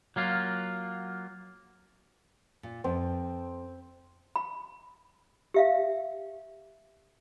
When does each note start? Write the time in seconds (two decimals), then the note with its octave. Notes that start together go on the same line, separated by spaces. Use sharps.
0.16 F#3 A#3 F4
2.63 A#2
2.84 F2 C4
4.36 B5
5.54 G4 E5 F5